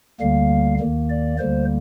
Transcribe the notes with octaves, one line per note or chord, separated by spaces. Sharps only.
D2 D3 G3 A#3 F5
D#2 D#3 A#3
D5
D2 D3 G3 A#3 C5